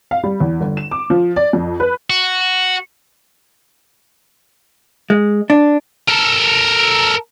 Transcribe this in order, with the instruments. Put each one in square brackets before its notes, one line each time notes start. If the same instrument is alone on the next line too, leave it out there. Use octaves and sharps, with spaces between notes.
[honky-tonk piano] F5
G3
E2
G1
E7
D6
F3
D5
F2
B4
[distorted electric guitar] F#4
[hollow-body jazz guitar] G#3
D4
[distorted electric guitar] A4 A#4